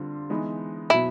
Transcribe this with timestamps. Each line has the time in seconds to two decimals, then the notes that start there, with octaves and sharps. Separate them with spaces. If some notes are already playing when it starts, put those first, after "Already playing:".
Already playing: D3 G3 C4 F4
0.30 E3 G#3 B3 D#4
0.90 B2 F#3 B3 E4